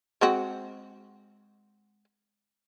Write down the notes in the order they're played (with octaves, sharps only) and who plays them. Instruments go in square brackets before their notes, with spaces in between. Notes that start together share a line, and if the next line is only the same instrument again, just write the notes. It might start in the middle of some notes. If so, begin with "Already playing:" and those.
[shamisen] G#3 C4 F#4